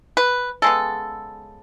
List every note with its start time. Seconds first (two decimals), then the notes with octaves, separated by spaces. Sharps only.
0.17 B4
0.62 C#3 G#3 B3 A4